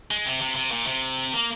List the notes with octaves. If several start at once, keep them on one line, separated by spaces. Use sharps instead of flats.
G#3
C3
C3
C3
A#2
C3
A#3